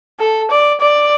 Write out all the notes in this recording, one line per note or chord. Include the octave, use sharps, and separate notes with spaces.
A4
D5
D5